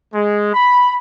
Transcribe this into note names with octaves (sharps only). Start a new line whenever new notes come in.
G#3
B5